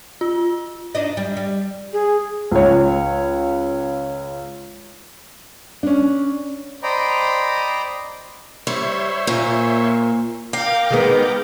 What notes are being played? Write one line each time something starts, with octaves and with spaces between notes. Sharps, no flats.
F4
D4 D#4 D#5
G3
G3
G#4
C#2 C#5
C#4 D4
C5 D5 D#5 G5 A#5 B5
G3 C5 C#5 E5
A#2
A#4 F5 G5 D6
D#3 G#3 B3